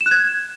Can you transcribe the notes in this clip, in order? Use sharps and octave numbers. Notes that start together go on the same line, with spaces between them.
E7
F#6
G#6